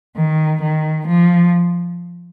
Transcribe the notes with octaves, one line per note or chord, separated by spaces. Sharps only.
D#3
D#3
F3